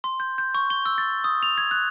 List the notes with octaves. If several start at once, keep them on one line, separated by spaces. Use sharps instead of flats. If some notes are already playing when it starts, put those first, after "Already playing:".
C6
G6
G6
C#6
G7
E6
A6
D#6
F7
G#6
F#6